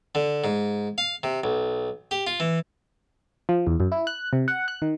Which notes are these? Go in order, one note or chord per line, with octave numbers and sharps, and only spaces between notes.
D3
G#2
F5
C3
B1
G4
F4
E3
F3
E2
F#2
E4
F#6
C3
F#5
F#6
D#3